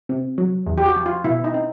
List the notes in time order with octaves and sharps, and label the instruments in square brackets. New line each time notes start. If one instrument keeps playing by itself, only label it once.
[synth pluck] C3
F#3
E2
[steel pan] G4
F#4
[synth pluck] F3
[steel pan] F4
[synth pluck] B2 [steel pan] E4
[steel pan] D#4
[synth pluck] C4